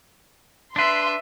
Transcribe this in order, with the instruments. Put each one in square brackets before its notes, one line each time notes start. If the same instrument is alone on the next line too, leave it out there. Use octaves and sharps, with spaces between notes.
[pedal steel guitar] D4 B4 [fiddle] E5 [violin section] C6